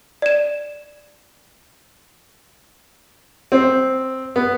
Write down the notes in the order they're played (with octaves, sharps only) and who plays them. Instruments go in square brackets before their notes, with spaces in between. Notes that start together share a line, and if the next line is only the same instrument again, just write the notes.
[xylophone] D5 E7
[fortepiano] C4
B3